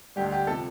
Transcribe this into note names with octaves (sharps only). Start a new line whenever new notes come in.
D2 D3 G3 G4
G4
C3 F3 A4